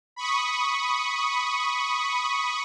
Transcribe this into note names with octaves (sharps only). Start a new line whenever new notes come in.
B5 C#6 D#6